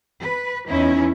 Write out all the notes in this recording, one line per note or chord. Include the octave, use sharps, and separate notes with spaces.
B4
E2 C#4 D#4 E4